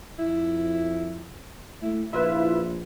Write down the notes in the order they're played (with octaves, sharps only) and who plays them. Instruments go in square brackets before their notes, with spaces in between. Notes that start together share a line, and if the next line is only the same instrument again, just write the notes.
[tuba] F2 [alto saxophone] E4
[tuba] A3 [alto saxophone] E4
[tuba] A#1 [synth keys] E4 F4 B4 [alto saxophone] E5